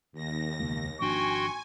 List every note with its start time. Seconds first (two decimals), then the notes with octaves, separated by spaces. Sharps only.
0.12 D#2 A#6
0.59 E1 C#2 A#3
1.01 G#1 F3 D4 F#4 G5 G#5 C6 C#6